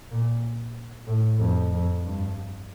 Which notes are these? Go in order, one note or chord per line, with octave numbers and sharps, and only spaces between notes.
A#2
A2
F2
F2
G2